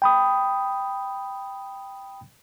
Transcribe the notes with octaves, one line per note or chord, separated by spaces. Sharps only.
G5 B5 D#6